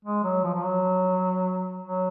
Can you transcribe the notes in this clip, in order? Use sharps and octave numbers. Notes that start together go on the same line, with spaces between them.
G#3
F#3
F3
F3
F#3
F#3